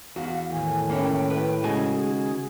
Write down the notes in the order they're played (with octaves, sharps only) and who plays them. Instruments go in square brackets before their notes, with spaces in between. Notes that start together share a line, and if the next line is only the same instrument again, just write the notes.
[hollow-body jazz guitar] E2 F#4 [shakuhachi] F5
[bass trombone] A2 [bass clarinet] D#3 [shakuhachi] G#5
[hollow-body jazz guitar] A#3 C#4 E4 [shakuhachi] G5
[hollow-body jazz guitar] B4
[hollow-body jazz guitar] C#3 G#3 G#5 [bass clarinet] F#4 [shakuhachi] G#4
[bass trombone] D#3 [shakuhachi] G#4